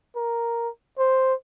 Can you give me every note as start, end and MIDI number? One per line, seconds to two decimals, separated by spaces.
0.16 0.69 70
0.99 1.34 72